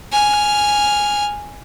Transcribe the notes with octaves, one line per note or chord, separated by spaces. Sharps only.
G#5 F6